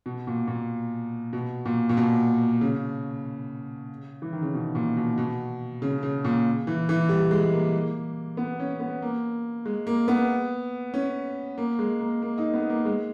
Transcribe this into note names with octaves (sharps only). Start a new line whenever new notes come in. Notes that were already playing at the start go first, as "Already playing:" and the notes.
B2
A#2
A#2
B2
A#2
A#2
B2
C#3
E3
D#3
C#3
B2
A#2
B2
B2
C#3
C#3
A#2
E3
E3
G3
G#3
A#3
B3
C#4
B3
A#3
G#3
A#3
B3
C#4
A#3
G#3
A#3
A#3
D#4
B3
A#3
G#3